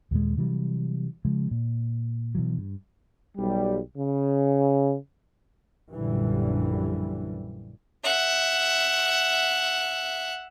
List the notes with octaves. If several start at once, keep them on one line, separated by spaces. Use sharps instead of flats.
D#2 A#2 G#3
C3 E3 F#3 G3
C#3 F3 G#3
A#2
B2 E3 F#3
G2
B1 G3
C#3
A#1 F#2 D3 E3 G3
E5 F#5